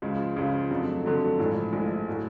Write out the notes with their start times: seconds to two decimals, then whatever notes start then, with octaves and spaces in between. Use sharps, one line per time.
0.02 C#2 C#3 F3 G#3
0.36 C#2 C#3 F3 G#3
0.71 F2 D3 F#3 A3
1.04 F2 D3 F#3 A3
1.39 A#1 A2 F3 G#3
1.73 A#1 A2 F3 G#3
2.09 A2 F#3 A3